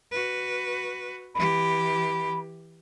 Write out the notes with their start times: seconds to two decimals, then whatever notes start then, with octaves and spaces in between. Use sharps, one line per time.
0.11 F#4 B4
1.35 E3 G4 B5